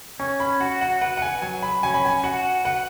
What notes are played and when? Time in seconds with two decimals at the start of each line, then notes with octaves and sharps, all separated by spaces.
0.20 C#4 C#6
0.40 B5
0.60 F#4 F#5
0.81 F#5
1.01 B4 F#5
1.17 F#5
1.22 G#5
1.42 F#3 G#5
1.62 B5
1.83 C#4 G#5
1.94 B5
2.05 G#5
2.24 F#4 F#5
2.65 B4 F#5